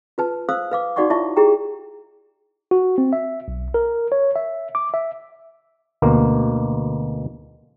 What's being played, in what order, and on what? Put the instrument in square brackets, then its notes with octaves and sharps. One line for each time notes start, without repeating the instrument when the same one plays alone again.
[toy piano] F4 B4 A5
C5 F5 D#6 E6
B4 F5 D6
D#4 F#4 D5 F#5 C#6 D6
E4 F4 C#5 E5 A5 C#6
E4 G4 G#4 G5 A#5
[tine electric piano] F#4
C4
E5
B1
A#4
C#5
E5
D6
E5
[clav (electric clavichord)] D2 B2 A#3